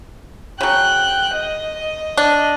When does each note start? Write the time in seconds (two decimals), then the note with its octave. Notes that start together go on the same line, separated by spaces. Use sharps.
0.61 C#3 F#3 G5 F#6
1.34 D#5
2.17 D4